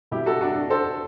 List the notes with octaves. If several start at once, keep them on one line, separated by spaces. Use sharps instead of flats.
B2 G3 E4 G4
F#4 A4
D4 F#4
D4
A4 C5